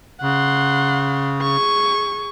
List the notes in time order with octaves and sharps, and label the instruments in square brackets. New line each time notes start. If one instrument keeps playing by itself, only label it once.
[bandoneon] C#3 [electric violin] F#5 C6
[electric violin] G#4 C#6